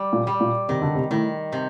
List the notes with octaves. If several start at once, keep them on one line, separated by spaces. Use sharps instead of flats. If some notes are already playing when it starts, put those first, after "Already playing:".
Already playing: G3
A#2
G3
A#2
C3 D#3
D3
C3
A2 D#3
C3